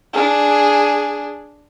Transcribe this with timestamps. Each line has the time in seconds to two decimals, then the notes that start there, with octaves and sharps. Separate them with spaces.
0.13 D4 G#4